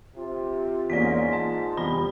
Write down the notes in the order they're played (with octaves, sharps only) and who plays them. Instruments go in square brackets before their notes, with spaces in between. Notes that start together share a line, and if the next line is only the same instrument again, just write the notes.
[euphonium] C3 [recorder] F4
[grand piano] E2 A#3 C#4 [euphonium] G#2 [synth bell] D5 B6
[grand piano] A5
[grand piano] F1 E2 A#6 [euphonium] G3 [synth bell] B5